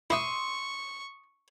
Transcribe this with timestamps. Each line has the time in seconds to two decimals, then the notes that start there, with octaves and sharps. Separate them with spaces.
0.10 E4 C6 C#6 D#6 E6